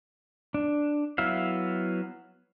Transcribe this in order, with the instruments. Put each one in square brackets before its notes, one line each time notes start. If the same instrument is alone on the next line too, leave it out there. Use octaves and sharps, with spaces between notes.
[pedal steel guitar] D4
F#3 B3 E4 E5 F5